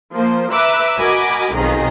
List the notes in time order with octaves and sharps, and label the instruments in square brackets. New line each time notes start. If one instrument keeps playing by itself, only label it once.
[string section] F3 A#3 C5
B4 E5 A#5 D6 E6 F#6
F#4 A#4 D#5 G#5 B5 D6
B1 F2 D#3 G#4 D#5 A#5